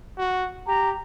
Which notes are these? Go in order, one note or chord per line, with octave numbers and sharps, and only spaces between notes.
F#4
G4 A#5